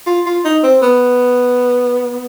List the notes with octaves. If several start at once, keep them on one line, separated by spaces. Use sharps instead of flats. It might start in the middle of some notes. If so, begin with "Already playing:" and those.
F4
F4
D#4
C4
B3